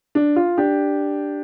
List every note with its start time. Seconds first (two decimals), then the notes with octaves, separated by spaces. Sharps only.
0.15 D4
0.36 F4
0.57 D4 G4